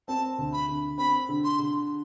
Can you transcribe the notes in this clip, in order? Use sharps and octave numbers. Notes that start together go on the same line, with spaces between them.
C4 A5
D2
B5
D3
C4 B5
D3
C6
D3